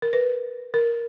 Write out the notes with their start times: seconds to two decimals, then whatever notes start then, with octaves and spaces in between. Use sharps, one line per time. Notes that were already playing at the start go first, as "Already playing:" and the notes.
0.02 A#4
0.13 B4
0.74 A#4